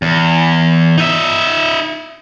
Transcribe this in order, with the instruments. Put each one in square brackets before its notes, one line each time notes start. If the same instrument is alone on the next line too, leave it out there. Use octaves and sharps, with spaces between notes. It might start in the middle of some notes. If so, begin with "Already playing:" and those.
[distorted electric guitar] E2
D#4 E5